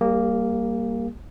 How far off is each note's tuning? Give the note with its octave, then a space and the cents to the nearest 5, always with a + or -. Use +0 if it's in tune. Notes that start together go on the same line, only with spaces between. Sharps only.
G3 +0 A#3 -5 G4 +45